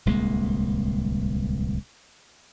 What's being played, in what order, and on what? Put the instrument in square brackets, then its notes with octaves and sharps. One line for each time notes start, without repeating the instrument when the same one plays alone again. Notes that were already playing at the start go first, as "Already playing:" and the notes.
[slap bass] D1 C2 G#3 A#3